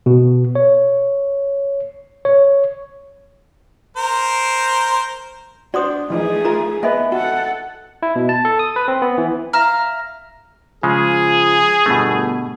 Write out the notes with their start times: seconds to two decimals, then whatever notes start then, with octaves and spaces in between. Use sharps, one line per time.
0.06 B2
0.55 C#5
2.25 C#5
3.97 A#4 C5
5.74 D4 F#4 C5 D5 C6 D#6
6.10 E3 F3 A3 D#4 G#4
6.45 F4 A#4 A#5
6.83 A#3 B3 B4 D#5 E5 G#5
7.12 F#4 A4 F#5
8.03 E4
8.16 B2
8.29 A5
8.45 A4
8.59 D#6
8.76 B4
8.88 C4
9.02 B3
9.18 E3
9.53 E5 F5 A#5 F6
10.83 C#3 F3 G#3 G#4
11.86 G1 B2 A3